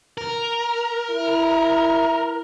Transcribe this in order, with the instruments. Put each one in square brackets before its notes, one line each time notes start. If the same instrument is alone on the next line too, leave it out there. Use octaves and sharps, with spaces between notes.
[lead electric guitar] A#4
[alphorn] E4